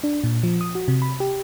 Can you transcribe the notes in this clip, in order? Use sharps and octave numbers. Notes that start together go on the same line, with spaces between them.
D4
A#2
F3
D#6
F#4
C3
B5
G4